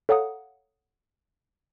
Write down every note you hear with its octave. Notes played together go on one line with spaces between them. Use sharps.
A4 C#5 F5 F#5 A#5 D#6